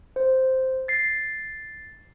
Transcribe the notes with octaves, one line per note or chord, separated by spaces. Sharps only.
C5
A6 C7